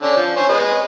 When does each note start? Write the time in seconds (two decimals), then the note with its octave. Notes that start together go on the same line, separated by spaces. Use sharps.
0.02 D3 C#4 D4
0.16 F3
0.37 C5 C#5 G#5
0.49 G#3 B4 D#5